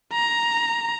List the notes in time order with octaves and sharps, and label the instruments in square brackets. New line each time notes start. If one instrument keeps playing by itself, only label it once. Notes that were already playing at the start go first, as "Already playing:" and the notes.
[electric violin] A#5